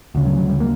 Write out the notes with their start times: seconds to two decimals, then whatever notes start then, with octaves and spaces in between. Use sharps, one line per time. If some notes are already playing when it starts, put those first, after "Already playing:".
0.15 D2 C#3
0.26 F#3
0.38 F#3
0.49 G3
0.60 A#3